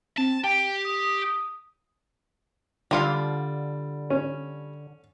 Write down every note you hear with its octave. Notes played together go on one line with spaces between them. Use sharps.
C4 A5
G4 G5
D#6
D3 G3 F4 F5
C#4